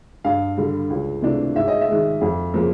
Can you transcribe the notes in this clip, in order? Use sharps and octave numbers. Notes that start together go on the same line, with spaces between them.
G2 F5
D3 G3
C#2
C3 E3 A3 D4
G#2 E5
D#5
E5
D#3 G#3
F2
C#3 F3 A#3